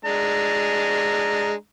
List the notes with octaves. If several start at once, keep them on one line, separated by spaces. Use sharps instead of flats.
G#3 D4 A#5